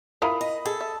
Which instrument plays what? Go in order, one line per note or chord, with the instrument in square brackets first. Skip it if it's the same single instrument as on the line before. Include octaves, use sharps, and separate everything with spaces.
[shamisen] E4 F4 A#4 [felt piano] B5 D#6
[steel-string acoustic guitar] D#5
[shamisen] G#4 [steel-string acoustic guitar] A4
[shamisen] E5